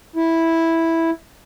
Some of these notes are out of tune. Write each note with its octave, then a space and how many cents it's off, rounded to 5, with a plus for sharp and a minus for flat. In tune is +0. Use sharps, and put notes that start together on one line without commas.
E4 -5